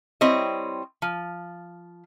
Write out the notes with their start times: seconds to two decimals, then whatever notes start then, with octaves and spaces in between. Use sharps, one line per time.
0.21 G3 C4 E4 C#5 D#5
1.02 F3